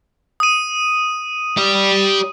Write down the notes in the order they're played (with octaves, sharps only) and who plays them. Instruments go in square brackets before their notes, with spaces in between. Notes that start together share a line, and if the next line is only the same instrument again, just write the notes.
[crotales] D#6 D#7
[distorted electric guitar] G4 D5